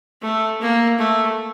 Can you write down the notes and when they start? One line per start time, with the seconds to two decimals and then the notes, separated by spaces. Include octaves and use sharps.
0.22 A3
0.60 A#3
0.99 A3